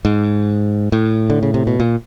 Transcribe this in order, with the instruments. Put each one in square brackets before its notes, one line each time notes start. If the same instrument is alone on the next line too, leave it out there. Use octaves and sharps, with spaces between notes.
[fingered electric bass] G#2
A2
D3
C#3
C3
B2
A#2